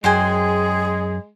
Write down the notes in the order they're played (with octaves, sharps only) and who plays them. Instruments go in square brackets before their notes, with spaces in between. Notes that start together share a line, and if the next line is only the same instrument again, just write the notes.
[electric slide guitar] F#2 [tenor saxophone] G#3 [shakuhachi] G#4 [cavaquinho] C5 G5 G#5